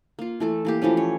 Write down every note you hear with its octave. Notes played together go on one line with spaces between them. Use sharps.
A#3 F4
E3 A3 A4
E3 A#3 G4
E3 F3 A3 C#4
C#5